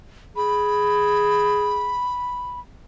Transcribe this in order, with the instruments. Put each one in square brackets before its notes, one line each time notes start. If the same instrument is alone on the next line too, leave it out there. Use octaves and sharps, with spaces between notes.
[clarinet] G#4 [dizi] B5